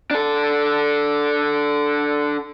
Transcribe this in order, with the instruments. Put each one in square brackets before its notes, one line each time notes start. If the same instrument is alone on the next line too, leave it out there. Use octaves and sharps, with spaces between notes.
[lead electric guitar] D4 A4